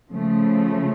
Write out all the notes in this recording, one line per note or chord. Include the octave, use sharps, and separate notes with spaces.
C#3 F3 A3